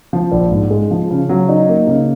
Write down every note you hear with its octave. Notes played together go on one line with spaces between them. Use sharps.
F3
A#1
G#2
G#3
F3
C#3
F#3
D#4
A#3
C#3